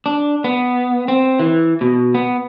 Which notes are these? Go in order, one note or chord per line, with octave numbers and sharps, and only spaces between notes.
D4
B3
C4
E3
B2
B3